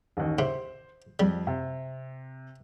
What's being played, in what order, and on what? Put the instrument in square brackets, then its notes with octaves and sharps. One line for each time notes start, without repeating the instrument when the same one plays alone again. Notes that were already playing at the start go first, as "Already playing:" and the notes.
[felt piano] A1 D#2
[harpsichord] C3 [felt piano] C5
[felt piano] F2 [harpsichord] G3
[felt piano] C3